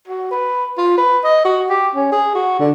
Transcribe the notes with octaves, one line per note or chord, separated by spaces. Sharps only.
F#4
B4
F4
B4
D#5
F#4
G4
C#4
G#4
F#4
D3